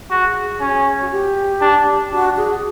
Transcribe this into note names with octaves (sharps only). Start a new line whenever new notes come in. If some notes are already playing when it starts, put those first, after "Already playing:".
F#4 G#4
C#4
F#4
G4
D4
D4 F#4
G#4